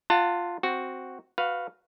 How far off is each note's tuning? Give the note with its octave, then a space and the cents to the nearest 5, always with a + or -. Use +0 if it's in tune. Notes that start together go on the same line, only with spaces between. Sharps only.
F4 +0 F#5 +0 A5 +30
C4 +0 F#4 +0
F#4 -15 B4 +0 F5 +0